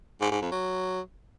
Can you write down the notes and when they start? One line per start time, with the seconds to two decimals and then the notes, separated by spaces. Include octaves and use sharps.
0.21 G#2
0.31 G#2
0.41 F2
0.51 F#3